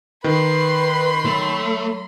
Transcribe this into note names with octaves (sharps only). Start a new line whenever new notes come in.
D#3 B4 B5 C6
F#3 A3